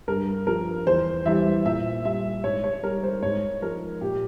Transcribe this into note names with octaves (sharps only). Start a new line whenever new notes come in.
G2 A#4
F3 A#4
E2 C5
E3 G3 E5
A#2 E5
G3 E5
G#2 C#5
C#5
G3 A#4
C5
G#2 C#5
F3 A#4
A#2 G4